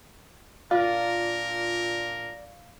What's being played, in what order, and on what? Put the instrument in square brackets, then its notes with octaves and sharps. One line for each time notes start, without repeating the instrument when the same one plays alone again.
[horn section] A#2 D4 A#4 [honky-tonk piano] F4 [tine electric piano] D5 [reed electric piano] F5